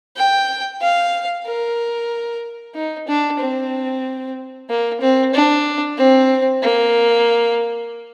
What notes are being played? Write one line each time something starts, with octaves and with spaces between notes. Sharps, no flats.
G5
F5
A#4
D#4
D4
C4
A#3
C4
D4
C4
A#3